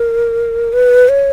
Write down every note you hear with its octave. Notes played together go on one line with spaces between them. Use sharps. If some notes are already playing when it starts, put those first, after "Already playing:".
Already playing: A#4
B4
C#5